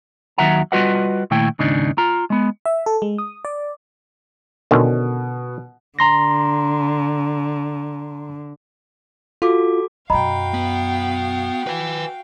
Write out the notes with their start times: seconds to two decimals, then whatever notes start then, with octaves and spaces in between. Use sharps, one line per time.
0.38 D#2 D#3 F#3 E5 F#5 A#5
0.72 G3 F4 F#4 B4 D#5 F#5
1.31 A#2 D#3 A3 E4 G5
1.59 D#2 G#2 C#3 D4 D#4
1.98 F4 A#5
2.30 G#3 B3
2.66 E5
2.86 A4
3.02 G#3
3.18 D#6
3.45 D5
4.71 B2 D3 D#3 C#4
5.99 D3 A#5 C6 A#6
9.42 F4 F#4 A4 D6
10.10 F#2 B2 F#4 D#5 F5 G5 A#5 B5
10.54 B3
11.67 B4 G#5